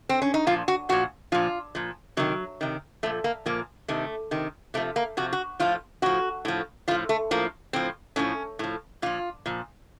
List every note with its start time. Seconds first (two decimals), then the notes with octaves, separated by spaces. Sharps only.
0.09 C4
0.22 C#4
0.34 D#4
0.47 A#2 F3 F4
0.68 F#4
0.89 A#2 F3 F#4
1.32 A#2 F3 F4
1.75 A#2 F3
2.17 C3 D#3 F#3
2.61 C3 D#3
3.03 A#2 F3 A3
3.24 A#3
3.46 A#2 F3 A#3
3.88 C3 D#3 A3
4.31 C3 D#3
4.74 C3 F3 A3
4.96 A#3
5.17 C3 F3 F#4
5.33 F#4
5.60 A2 F3 F4
6.02 A2 F3 F#4
6.45 A2 F3
6.88 F3 F4
6.91 A2
7.09 A3
7.31 A2 F3 A#3
7.73 A2 F3 C4
8.16 A2 F3 C#4
8.59 A2 F3
9.02 A#2 F3 F4
9.46 A#2 F3